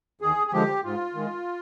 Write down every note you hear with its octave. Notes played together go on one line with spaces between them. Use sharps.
D#2 G#4
G#4
D3 F3 G#3 G4
G#2 F4
D#3 G#3